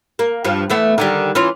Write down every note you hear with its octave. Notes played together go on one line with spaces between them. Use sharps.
A#3
G2 F3
E2 A3 B3
D3 D#3 G3
E3 C#4 F4